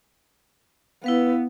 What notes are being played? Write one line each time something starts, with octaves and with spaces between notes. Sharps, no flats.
B3 E4 B4 F5